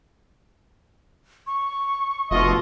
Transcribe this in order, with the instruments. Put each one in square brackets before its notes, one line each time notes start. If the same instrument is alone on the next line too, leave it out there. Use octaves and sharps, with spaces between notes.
[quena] C#6
[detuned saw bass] F1 [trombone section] B2 A3 F4 [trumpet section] D#5 [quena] C#6